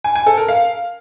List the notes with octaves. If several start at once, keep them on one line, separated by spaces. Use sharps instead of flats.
G#5
G#5
A4
A#4
F5